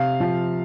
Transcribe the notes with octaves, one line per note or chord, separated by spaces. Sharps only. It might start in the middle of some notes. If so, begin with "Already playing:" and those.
Already playing: C3 F5
F3